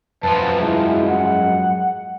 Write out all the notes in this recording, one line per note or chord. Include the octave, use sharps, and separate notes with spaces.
F#2 F3 B4 A5
G#3 E4
F#5